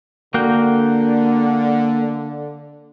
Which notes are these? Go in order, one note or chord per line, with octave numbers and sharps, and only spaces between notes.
D3 A#3 F#4 G5